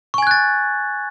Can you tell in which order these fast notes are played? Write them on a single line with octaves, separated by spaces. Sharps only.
C#6 G#5 G#6 F#6 A6